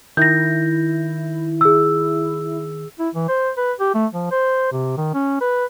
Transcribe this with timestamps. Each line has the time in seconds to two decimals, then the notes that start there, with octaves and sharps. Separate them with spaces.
0.17 D#3 E4 G6 A#6
1.61 G#4 E6
2.99 E4
3.14 E3
3.28 C5
3.57 B4
3.80 G4
3.95 A3
4.13 F3
4.31 C5
4.72 C3
4.97 D#3
5.14 C#4
5.41 B4